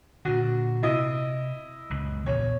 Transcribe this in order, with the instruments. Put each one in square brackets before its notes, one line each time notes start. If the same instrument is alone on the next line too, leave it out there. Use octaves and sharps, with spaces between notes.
[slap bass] A#2 D3 [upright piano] F#4
[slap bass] C3 [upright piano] E4 D#5
[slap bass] C#2 F#2
[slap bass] A#1 E2 A#2 [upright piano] C#5